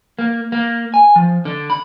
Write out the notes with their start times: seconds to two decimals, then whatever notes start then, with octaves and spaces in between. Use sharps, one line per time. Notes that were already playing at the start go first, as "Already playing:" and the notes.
0.19 A#3
0.52 A#3
0.94 G#5
1.16 F3
1.45 D3
1.70 B5